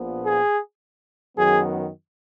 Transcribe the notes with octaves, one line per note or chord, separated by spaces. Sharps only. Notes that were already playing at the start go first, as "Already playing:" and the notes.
Already playing: A#1 A#2 F3 B3
G#4
F#2 D#3 F#3 B3 G#4